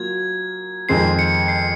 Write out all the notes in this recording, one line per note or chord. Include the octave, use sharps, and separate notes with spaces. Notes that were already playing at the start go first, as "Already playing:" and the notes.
Already playing: F#3 A#3 F4 G#6
F2 D#3 G#3 C4 C7
C#7
C7